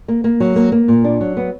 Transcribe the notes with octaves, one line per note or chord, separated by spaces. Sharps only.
A#3
A#3
F#3
A#3
A#3
A#2
D4
F#3
B3